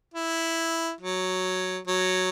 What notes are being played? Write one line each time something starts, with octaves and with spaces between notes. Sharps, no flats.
E4
F#3
F#3